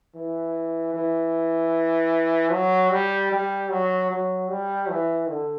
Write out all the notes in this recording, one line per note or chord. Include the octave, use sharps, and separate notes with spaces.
E3
E3
F#3
G3
G3
F#3
F#3
G3
E3
D3